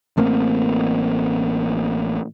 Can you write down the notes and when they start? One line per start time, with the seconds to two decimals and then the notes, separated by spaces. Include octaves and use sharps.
0.17 A1 A3 A#3 C4